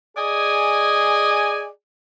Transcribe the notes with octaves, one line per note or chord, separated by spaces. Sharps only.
G#4 D5 D#5 G#5